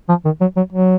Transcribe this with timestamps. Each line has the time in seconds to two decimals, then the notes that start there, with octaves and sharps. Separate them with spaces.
0.09 F3
0.25 D#3
0.41 F#3
0.57 F#3
0.73 F#3